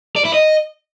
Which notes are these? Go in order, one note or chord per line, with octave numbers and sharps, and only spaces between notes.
D5
E4
D#5